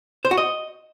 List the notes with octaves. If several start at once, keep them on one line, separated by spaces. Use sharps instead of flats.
C5
F#4
D#5